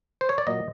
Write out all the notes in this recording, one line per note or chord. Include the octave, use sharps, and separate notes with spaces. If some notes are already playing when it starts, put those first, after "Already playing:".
C5
C#5
D5
A#2 F#3 A#3 D#5